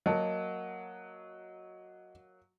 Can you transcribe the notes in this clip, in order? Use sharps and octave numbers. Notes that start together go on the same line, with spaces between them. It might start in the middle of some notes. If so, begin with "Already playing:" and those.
F#3 A#3 D#5 A5